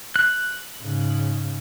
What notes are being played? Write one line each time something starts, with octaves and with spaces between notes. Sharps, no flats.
F#6
G#2 C#3